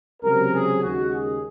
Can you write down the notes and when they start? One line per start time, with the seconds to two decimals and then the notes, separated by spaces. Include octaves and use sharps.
0.22 C#2 C3 F#3 A#4
0.51 G#4
0.81 D#2 C#3 G#3 F#4
1.12 G#4